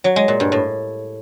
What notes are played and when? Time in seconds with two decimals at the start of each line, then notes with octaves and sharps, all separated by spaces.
0.04 F#3
0.16 G#3
0.28 A#2
0.40 G2
0.52 A2